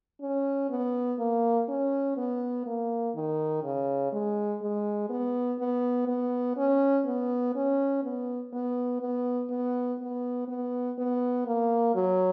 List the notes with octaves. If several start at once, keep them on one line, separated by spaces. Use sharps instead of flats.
C#4
B3
A#3
C#4
B3
A#3
D#3
C#3
G#3
G#3
B3
B3
B3
C#4
B3
C#4
B3
B3
B3
B3
B3
B3
B3
A#3
F#3